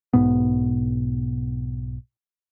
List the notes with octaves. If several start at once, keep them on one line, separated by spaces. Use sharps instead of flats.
B1 G#2 B2 B3